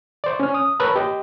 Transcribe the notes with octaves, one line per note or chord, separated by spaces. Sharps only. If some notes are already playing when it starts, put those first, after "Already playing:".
C5 D5
C#4 F6
D#6
A#4 B4 C#5 A5 E6 F#6
G4 D#5